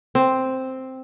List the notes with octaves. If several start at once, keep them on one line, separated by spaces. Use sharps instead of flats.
C4